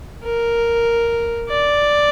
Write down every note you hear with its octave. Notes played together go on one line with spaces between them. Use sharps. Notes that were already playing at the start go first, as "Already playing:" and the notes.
A#4
D5